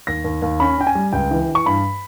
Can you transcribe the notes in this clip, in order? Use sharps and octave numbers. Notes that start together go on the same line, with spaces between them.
D#2 A#6
D#2
D#2
C#4 B5
C#4 G5
G#5
G3
C#2 G5
E3
E3
C#6
G2 B5